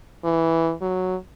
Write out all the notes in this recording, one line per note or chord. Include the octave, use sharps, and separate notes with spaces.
E3
F#3